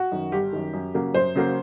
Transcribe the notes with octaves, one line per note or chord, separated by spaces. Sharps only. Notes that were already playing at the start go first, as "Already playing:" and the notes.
Already playing: F#4
F#2 D#3
G1 G4
F#2 D#3
F#2
C#3 F#3 A#3
F#2 C5
C#3 F#3 A#3